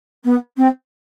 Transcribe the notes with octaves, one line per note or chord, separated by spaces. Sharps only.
B3
C4